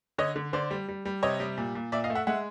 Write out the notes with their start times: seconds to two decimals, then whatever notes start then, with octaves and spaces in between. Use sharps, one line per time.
0.18 D3 C#5 D#5
0.36 D3
0.53 D3 C5 D5
0.71 G3
0.88 G3
1.05 G3
1.23 C3 C#5 D#5
1.40 G3
1.58 A#2
1.75 A#2
1.92 A#2 D5 E5
2.04 D#5 F5
2.10 A3
2.15 E5 F#5
2.27 G#3 E5 F#5